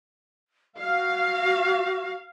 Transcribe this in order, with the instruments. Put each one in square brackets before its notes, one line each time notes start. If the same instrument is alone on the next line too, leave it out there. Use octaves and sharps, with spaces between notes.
[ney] F#4 [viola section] F5